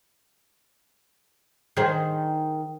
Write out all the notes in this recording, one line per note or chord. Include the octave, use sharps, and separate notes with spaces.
D#3 G#4 C5